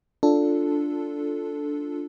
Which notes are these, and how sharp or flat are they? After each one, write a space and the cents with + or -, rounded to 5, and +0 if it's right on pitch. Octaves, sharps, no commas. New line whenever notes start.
D4 -5 F4 +0 A4 +0